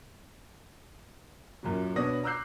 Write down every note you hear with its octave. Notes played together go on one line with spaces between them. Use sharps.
F#2 A#2 F#3
B2 B3 D4 C#5 D#6 A#6
A#5 D6 E6 F#6 G6 C7